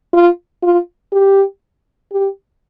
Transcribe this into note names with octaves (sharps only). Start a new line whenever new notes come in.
F4
F4
G4
G4